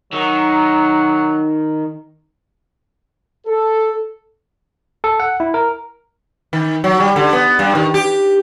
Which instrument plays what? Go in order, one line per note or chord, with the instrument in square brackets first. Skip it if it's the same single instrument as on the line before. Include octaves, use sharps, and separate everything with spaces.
[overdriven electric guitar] D#3 [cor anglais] F#3
[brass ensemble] A4
[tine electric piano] A4
F#5
E4
A#4
[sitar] D#3
F#3
G3
D3
B3
G2
D#3
G4